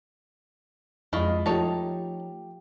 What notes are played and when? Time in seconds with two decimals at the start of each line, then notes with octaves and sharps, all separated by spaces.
1.13 F2 G#3 E4 F4 D#5 C#6
1.46 F3 A3 D#4 F4 G4 C#5 A5